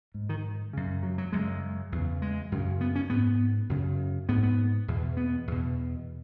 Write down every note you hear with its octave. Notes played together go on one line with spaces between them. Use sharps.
G#2
D#3
F#2 C#3
F#3
F#3
F#2 C#3 G#3
E2 C#3
G#3
F#2 C#3
B3
C#4
G#2 B3
F#2 C#3
G#2 B3
B3
E2 B2
B3
E2 B2